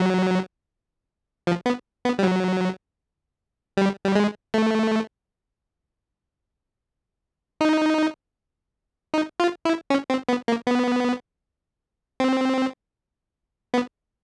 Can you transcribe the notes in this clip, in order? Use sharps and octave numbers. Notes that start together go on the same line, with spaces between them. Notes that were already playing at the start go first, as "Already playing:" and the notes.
Already playing: F#3
F3
B3
B3
G3
F#3
G3
G3
G#3
A3
D#4
D#4
F4
E4
C#4
C4
B3
A#3
B3
C4
B3